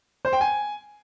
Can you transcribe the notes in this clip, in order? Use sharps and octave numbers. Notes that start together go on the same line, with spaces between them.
C5
G5
G#5